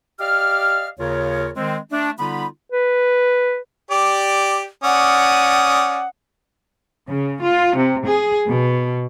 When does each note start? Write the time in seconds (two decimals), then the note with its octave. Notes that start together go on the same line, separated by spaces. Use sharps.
0.19 G4 D5 D#5 F5 F6
0.98 D#2 C#3 F4 A#4 C#5
1.56 D#3 G#3 C4
1.91 A3 D4
2.18 D3 G3 B3 D#4 F4 B5
2.72 B4
3.91 G4 D5
4.84 C#4 D5 F#5 D#6
7.09 C#3
7.43 F4
7.77 C3
8.07 G#4
8.48 B2